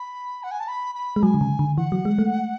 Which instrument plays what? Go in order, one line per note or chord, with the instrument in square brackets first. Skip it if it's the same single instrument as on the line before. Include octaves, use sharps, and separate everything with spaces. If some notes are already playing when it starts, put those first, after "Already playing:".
Already playing: [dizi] B5
F#5
G#5
A5
B5
B5
[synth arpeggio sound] G#3
[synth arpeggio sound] F#3 [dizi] G#5
[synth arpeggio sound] D3
C#3
D3
[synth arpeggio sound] E3 [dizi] F#5
[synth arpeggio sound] F#3
G#3
A3